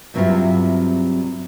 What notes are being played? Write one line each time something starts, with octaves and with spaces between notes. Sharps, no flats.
G2 C3 F#3 C4 E4 F4